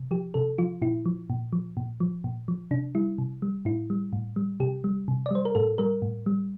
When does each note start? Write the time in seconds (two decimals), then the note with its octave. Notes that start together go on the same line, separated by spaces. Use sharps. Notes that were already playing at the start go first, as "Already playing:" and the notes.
Already playing: C3
0.11 F3 G4
0.34 C3 A4
0.58 F3 F4
0.82 A#2 E4
1.06 F3
1.30 A#2
1.53 F3
1.77 A#2
2.00 F3
2.24 A#2
2.48 F3
2.71 C3 D4
2.95 G3 E4
3.18 C3
3.42 G3
3.65 A2 E4
3.90 G3
4.13 A2
4.36 G3
4.60 C3 G4
4.84 G3
5.08 C3
5.26 D5
5.31 G3 C5
5.45 A#4
5.55 A2 A4
5.78 G3 A#4
6.02 A2
6.26 G3